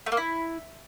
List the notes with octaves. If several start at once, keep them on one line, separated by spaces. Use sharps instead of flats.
A3
A#3
E4